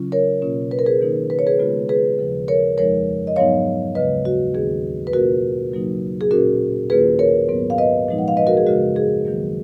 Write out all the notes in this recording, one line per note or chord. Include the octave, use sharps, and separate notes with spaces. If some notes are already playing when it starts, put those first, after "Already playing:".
Already playing: C#3 F#3 C#4 F4
A#4 C#5
B2 A#3 C#4 F4
B4
A#4
G#4 B4
D#3 A#3 D#4
B4
C#5
G#4 B4
C#3 G#3 B3 F4
G#4 B4
D#2 C#3 F3
A#4 C#5
F2 F3 G#3 D#4 A#4 C#5
D#5
G#2 F#3 B3 D#4 C#5 F5
D#2 C#3 G#3 B4 D#5
F#4
D#2 D#3 A#3 C#4 G#4
B4
B2 A#3 C#4 F4 F#4 A#4
C#3 F#3 A#3 D#4
G#4
A#2 F#3 C#4 F#4 A#4
D#2 D#3 A#3 F4 G#4 B4
A#4 C#5
G#2 F#3 B3
F5
B4 D#5
A#2 F3 G#3 D#4
F#5
F5
B4 D#5
F#4 A#4
G#4
F#2 C#3 G#3 F#4
G#4
D#2 D#3 F#3 A#3